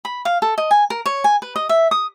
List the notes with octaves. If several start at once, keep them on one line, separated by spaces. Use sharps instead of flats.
B5
F5
A4
D#5
G#5
A#4
C#5
G#5
B4
D#5
E5
D#6